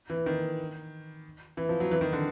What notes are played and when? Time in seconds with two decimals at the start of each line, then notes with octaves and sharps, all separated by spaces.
0.10 E3
0.26 D#3
1.57 E3
1.69 F3
1.80 F#3
1.91 E3
2.01 D#3
2.13 D3